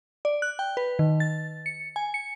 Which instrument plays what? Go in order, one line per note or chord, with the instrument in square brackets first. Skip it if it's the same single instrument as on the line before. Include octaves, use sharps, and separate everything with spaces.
[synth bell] D5
F#6
G5
B4
D#3
A6
C#7
G#5
C#7